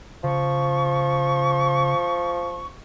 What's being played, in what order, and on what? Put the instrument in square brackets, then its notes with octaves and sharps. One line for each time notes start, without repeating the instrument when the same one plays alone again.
[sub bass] C#3 [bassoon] F3 [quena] C#6